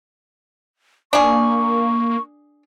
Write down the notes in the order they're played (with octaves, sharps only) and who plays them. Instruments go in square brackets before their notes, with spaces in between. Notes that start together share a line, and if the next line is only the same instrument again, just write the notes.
[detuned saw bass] A#3 [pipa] D4 G#4 [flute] C#6